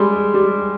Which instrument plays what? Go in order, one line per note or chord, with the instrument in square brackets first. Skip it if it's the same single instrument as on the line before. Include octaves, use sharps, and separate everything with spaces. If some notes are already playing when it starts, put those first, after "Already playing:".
Already playing: [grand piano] G3 G#3
G3